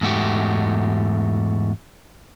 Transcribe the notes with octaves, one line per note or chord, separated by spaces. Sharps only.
E2 G#2 A3 F#4 G4